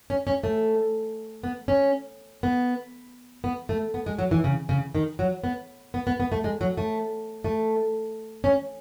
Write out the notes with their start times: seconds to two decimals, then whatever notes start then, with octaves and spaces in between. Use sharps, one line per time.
0.10 C#4
0.27 C#4
0.44 A3
1.43 B3
1.68 C#4
2.43 B3
3.44 B3
3.69 A3
3.94 B3
4.06 G#3
4.19 F#3
4.31 E3
4.44 C#3
4.69 C#3
4.95 D#3
5.19 F#3
5.44 B3
5.94 B3
6.07 B3
6.20 B3
6.32 A3
6.44 G#3
6.61 F#3
6.77 A3
7.45 A3
8.44 C#4